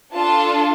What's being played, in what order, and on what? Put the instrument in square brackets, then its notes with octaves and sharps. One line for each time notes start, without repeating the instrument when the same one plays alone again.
[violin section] D4 F4 A4 A5